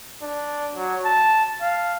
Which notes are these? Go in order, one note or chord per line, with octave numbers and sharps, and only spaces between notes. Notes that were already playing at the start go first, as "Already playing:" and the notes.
D4
F#3
A5
F5